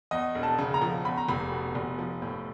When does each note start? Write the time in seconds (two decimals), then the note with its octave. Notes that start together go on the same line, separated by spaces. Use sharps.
0.11 E2 D#5
0.35 E1
0.43 A5
0.59 C#3
0.74 A#5
0.81 F3
1.05 E2 B5
1.17 A#5
1.29 F1 B5
1.52 B2
1.75 F1
1.98 F3
2.22 A2